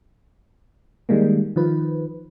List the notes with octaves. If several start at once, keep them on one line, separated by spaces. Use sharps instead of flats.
D#3 G3 G#3 A#3
D#3 F3 B4